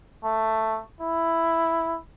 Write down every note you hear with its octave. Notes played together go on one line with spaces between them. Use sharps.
A3
E4